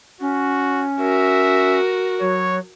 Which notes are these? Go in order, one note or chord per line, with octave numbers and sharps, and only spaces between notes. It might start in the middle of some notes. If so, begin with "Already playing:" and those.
C#4 F#4
F#4 A#4 E5
F#3 C#5